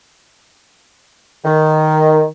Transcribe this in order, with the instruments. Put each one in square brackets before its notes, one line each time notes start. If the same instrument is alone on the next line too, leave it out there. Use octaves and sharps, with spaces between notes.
[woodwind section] D#3